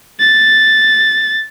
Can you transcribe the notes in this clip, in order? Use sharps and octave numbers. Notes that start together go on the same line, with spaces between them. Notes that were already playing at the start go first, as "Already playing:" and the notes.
A6